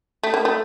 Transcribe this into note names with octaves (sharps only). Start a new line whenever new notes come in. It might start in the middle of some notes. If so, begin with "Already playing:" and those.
A3
A#3
A3